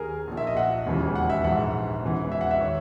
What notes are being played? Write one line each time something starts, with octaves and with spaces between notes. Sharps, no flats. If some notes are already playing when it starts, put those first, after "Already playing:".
Already playing: D#2 D#3 G#4 A#4
A#1 A#2
E5
D#5
F#5
E1 D#2 C#3 E3
F#5
E5
A#1 G#2 E3 F#5
E1 E2 C#3 E3
E5
F#5
E5
D#3 C#5